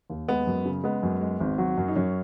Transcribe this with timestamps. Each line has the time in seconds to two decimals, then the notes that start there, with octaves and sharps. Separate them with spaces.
0.10 D#2
0.28 G#3 B3
0.47 F#2
0.65 C#3
0.84 G#3 B3
1.03 F#2
1.21 G#3
1.40 G#1
1.58 F#3
1.78 F#2
1.88 D#4
1.95 F#2 C#4